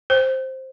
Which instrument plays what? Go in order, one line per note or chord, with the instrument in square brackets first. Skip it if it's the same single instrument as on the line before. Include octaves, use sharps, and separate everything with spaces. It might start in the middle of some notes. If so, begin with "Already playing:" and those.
[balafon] C5